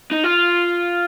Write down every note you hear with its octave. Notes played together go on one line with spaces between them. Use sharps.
D#4
F4